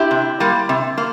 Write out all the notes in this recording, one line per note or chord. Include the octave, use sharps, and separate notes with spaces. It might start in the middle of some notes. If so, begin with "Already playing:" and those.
Already playing: E4 G4
C3
G3 A#3
C3
A#3